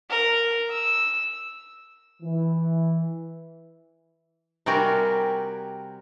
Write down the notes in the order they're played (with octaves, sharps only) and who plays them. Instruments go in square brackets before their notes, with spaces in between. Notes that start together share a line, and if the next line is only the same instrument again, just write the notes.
[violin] A#4
E6
[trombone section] E3
[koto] C3 G3 F#4 G4 A#4 G#5